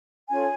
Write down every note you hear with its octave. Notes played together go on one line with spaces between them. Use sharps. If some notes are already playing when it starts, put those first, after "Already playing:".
C#4 F4 A4 C#5 G#5